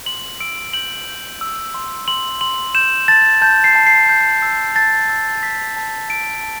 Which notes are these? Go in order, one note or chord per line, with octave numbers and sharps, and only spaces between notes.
C6 F#7
E6 D7
G6 F#7
G6
E6
C6
C6 F#7
C6 F#7
G6 E7
A5 A6
A5 G6
C7
A5
C7
G6
E6
A5 A6
E6
E6 B6
A5
E6 D7
A5